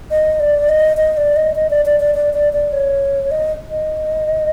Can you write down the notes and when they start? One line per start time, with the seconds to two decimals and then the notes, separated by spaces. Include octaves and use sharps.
0.11 D#5
0.40 D5
0.69 D#5
0.97 D#5
1.17 D5
1.36 D#5
1.56 D#5
1.70 D5
1.85 D5
2.00 D5
2.14 D5
2.34 D5
2.53 D5
2.72 C#5
3.31 D#5
3.70 D#5